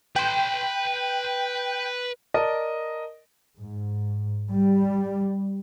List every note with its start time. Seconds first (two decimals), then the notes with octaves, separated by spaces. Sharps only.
0.16 B4 G5 C6
2.34 A#4 D5 D#5 A5
3.58 G#2
4.53 G3